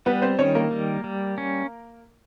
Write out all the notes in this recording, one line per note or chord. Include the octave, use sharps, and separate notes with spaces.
G3 B3 B4
C4 C5
D#3 C#4 C#5
A#3 A#4
G3
G3
C#4